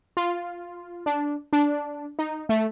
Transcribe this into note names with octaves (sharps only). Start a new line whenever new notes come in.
F4
D4
D4
D#4
A3